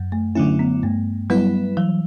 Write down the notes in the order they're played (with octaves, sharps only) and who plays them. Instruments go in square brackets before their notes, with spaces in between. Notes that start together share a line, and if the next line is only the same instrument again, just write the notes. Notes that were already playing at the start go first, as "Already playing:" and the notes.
Already playing: [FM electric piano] F#2
[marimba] A3
[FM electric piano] D3 F#3 C#4 E4 [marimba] A3
[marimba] B3
[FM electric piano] G2 [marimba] A3
[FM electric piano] F#3 B3 E4 B4 [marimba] G3
[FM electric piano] E3 [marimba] F#3